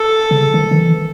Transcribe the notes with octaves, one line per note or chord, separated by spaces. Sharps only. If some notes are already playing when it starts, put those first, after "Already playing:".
Already playing: A4
C#3
D#3
D#3
E3